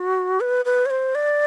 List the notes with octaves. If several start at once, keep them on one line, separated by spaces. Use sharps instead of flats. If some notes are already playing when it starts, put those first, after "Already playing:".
Already playing: F#4
B4
B4
C#5
C5
D5